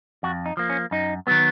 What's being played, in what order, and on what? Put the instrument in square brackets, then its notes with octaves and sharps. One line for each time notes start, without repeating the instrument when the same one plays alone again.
[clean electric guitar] F2 F#4
D#4
F3 A#3
C#4
F#2 D#4
D#3 F#3 B3